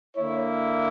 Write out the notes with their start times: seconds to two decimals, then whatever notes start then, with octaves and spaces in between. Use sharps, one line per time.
0.15 D3 A#3 E4 C#5